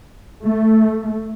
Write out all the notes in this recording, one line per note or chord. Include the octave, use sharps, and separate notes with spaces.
A3